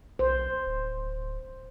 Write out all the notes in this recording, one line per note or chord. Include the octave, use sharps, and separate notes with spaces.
B1 C5
D1